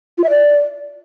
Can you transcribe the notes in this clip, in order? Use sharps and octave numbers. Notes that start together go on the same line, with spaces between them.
F4
E5
D5